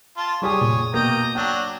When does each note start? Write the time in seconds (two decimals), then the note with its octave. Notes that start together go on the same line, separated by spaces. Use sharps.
0.17 F4 A5
0.42 G3 G4 G#4 C#5 D#6
0.61 A#2
0.94 B2 A#3 G5 A#5 D#6
1.35 F#3 D4 G5